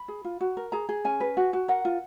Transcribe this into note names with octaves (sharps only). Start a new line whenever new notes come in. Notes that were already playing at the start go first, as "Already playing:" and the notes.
Already playing: B5
G#4
F4
F#4
A#4
G#4 A#5
G#4
C#4 G#5
B4
F#4
F#4
A#4 F#5
F4